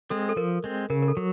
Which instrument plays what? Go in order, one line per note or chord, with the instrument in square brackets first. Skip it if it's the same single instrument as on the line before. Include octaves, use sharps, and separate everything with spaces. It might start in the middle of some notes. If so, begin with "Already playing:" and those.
[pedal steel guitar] G#3 C4 [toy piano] A4
[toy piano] A4
[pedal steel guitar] F3 [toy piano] A#4
[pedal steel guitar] G#3 C4
[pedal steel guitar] C#3 [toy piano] A#4
[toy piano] A#4
A4
[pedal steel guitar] F#3